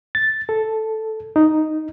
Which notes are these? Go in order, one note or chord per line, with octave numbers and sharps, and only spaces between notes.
A6
A4
D#4